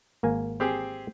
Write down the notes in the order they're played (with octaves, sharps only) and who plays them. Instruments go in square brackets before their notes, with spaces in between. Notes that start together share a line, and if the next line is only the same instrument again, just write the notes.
[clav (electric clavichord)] G#1 A#3 G#5
[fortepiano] C4 G4 G#4